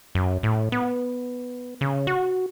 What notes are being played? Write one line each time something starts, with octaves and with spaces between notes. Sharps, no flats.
F#2
A2
B3
C#3
F#4